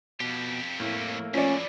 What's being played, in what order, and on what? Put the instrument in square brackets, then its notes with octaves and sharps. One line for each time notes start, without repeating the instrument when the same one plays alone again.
[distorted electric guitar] F2 G4 [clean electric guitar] B2
[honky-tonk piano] A2 [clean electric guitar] A3 A#3
[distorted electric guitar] E2 A2 [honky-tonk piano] F3 D5 [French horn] C#4